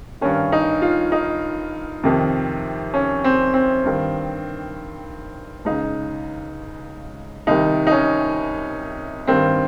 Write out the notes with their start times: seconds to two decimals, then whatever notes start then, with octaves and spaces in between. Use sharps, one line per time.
0.21 G2 D#3 C#4
0.52 D#4
0.82 F4
1.12 D#4
2.03 F2 C3 D#3
2.94 C#4
3.24 C4
3.54 C4
3.84 G2 D#3
5.65 C#2 C#3 D#4
7.47 C2 C3 D#3 D#4
7.87 D#4
7.92 C#4
9.27 G2 D#3 C4